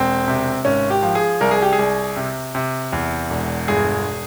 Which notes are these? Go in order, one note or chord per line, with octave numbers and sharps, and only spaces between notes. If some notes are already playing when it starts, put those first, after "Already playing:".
Already playing: E1 C4
C3
G#1 C#4
G4
F3
G#4
C2 A#4
G#4
G4
G#4
C2
C3
C3
E2
E1
G1 G#4